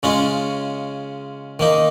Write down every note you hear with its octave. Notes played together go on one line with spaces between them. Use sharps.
C#3 G#3 C#4 F4
D#3 A#3 D#4